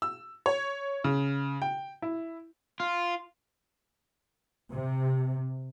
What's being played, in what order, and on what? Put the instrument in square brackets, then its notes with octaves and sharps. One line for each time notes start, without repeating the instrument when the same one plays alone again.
[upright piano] E6
C#5
C#3
G5
E4
[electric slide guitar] F4
[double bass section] C3